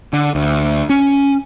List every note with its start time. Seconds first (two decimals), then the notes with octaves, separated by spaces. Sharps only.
0.13 D3
0.35 D2
0.89 C#4